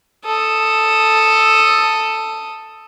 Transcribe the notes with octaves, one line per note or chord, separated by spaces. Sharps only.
A4 D#6